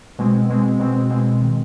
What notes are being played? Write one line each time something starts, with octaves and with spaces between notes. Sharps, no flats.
B2 G#3 C4
B2 G#3 C4
B2 G#3 C4
B2 G#3 C4
D#3